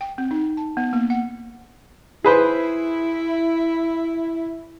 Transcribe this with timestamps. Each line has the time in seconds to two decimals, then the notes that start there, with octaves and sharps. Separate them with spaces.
0.01 G5
0.18 C4
0.31 D#4
0.57 A5
0.77 B3
0.93 A#3
1.10 F#5
2.24 E4 G#4 B4 C5